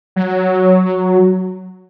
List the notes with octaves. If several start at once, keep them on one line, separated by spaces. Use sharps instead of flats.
F#3